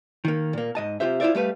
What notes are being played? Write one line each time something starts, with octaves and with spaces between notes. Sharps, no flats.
D#3 A#3
A#2 A#3
G#2 D#5 A5
C3 F4 G4 C5 E5
E4 F4 A4 C5 D5 E5
G3 A3 B4 F5